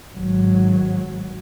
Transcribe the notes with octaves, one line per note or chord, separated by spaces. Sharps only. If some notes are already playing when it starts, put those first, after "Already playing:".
G#1 F#3